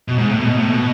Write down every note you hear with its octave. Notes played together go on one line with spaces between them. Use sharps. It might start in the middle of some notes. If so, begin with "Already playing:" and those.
B2
G#2
A2
B2
A2
B2